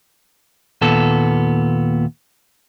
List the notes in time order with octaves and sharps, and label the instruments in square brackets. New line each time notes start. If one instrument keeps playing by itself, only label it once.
[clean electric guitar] D#2 A#2 B3 A4